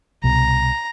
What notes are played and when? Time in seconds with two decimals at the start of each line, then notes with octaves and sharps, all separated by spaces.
0.24 C2 B2 A#5